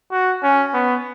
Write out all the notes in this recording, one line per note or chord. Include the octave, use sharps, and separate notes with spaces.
F#4
C#4
B3